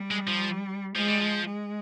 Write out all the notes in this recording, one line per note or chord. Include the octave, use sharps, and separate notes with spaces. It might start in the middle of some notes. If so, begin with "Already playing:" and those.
Already playing: G3
G#3
F3
F3 G#3
G3
F3
G#3